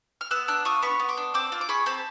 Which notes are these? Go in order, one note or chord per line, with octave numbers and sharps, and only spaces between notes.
F6
B3 E6 F#6
D4 E6 F#6
F4 C#6 D#6
B3 B5 C#6
B3
C6 D6
D4
C4 D6 E6
F4
D6
G#4 B5 C#6
C4 A5 B5